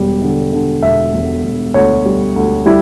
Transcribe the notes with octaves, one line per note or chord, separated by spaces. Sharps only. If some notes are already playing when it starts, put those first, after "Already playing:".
Already playing: E1 G3
D3
D3
E1 E5
E1
E1
D2 C#5
G3
D2
G3 E4